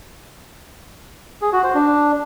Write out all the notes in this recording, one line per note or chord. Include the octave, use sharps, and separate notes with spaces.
G#4
F#4
C5
D4